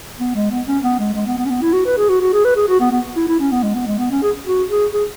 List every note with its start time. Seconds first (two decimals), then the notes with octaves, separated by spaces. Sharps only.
0.20 B3
0.35 G#3
0.51 B3
0.67 C#4
0.83 B3
0.99 G#3
1.14 G#3
1.27 B3
1.38 B3
1.46 C#4
1.50 B3
1.62 E4
1.73 F#4
1.86 B4
1.97 G#4
2.09 F#4
2.21 F#4
2.33 G#4
2.45 B4
2.56 G#4
2.68 F#4
2.80 B3
2.92 B3
3.16 E4
3.28 E4
3.40 C#4
3.52 B3
3.63 G#3
3.75 B3
3.87 G#3
3.98 B3
4.11 C#4
4.23 G#4
4.46 F#4
4.70 G#4
4.93 G#4